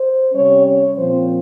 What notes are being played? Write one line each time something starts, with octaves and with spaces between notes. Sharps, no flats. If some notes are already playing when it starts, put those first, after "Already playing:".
Already playing: C5
C3 G3 C#4 C#5
C#5
A#2 F3 C4 C5